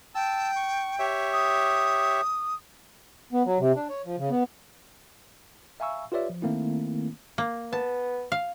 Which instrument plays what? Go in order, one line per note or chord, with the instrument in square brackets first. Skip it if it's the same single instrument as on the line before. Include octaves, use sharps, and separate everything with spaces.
[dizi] G5 [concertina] A5 E6
[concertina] C#6
G4 C#5 E5
[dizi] D#6
[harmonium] B3
F#3
C3
D4
C#5
F3
C#3
B3
[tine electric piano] E5 F5 G#5 A#5 C#6 E6
F4 G4 B4 C#5 D5 E5
F3
D#3 A3 A#3 C4 E4
[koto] A#3
[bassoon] B3 [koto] A5
[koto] F5